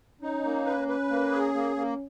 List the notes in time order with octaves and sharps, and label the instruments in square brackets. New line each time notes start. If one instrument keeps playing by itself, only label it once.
[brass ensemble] C#4 [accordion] D#4
[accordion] A#3
B4
B4
A#3
G#4
A#3
A#3